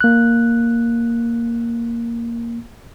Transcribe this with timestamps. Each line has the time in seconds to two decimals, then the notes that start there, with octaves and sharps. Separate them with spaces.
0.01 A#3 F#6